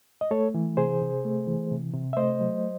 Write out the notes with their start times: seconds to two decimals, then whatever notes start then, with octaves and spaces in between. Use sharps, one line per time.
0.21 D#5
0.31 A3 A4 C#5
0.54 E3
0.77 C3 G#4 C5
1.01 C3
1.25 A3
1.47 E3
1.71 C3
1.94 C3
2.13 E5
2.17 A3 C5 D#5
2.41 F#3